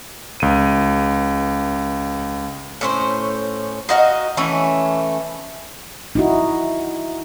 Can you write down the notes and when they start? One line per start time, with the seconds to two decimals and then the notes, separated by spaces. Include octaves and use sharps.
0.40 C#2 D#7
2.81 A2 C#4 C5
3.89 D#4 F#4 D#5 F5
4.37 E3 A3 C#4 G#5
6.15 D#4 E4 F#4